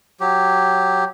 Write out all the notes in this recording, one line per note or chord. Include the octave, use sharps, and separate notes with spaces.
F#3 G4